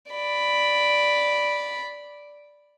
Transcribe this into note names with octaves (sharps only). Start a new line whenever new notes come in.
D5 B5